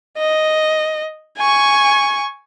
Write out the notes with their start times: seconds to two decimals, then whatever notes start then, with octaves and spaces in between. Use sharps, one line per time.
0.18 D#5
1.38 G#5 C#6